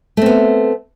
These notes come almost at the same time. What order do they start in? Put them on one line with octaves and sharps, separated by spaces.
A3 C4 B3